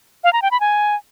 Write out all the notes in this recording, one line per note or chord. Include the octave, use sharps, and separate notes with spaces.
F5
A#5
G5
B5
G#5